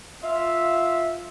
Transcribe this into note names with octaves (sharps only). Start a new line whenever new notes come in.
F4 E5